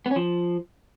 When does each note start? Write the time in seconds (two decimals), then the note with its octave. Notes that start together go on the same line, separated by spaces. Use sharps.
0.06 B3
0.11 C#4
0.16 F3